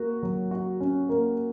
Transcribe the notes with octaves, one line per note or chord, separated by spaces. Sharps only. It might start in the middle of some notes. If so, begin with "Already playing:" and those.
Already playing: A#3 F#4
F#3
F#4
C#4
A#3